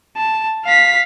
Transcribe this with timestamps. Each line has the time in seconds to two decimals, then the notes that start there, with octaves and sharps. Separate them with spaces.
0.17 A5
0.65 F5 B6